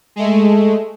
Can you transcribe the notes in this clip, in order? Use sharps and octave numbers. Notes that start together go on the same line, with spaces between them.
G#3 A3